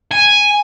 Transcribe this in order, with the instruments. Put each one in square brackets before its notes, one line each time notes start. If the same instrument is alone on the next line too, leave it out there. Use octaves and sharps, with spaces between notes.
[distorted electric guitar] G#5